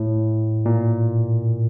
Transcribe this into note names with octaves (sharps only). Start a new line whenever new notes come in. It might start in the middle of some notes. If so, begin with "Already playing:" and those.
Already playing: A2
A#2